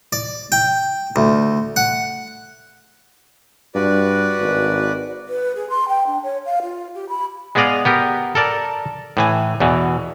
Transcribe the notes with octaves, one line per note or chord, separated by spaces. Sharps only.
D5
G5
D2
F#5
G2 F#4 B4 D5
G#1
B4
G#4
C6
G5
D4
C#5
F5
F4
G4
B5
G#3 B3 G#4 D5 D#5 F5
B3 G4 A#4
A4 A#4 D5 A5
A2 E3 G#5
E2 B2 E3